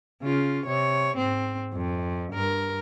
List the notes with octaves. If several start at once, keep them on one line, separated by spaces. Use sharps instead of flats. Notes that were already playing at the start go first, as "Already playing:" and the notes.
C#3 F4
C3 C#5
G#2 C4
F2
G2 A#4